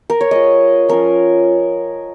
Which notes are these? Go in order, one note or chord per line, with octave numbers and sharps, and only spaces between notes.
A#4
C#5
G#3 F4 D#5
F3 C#4 F4 A#4